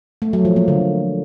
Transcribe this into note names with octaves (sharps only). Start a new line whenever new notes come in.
A3
F#3
F3
A#3
D3